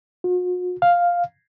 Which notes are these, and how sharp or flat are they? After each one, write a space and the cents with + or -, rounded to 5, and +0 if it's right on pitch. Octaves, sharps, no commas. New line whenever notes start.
F#4 -45
F5 +5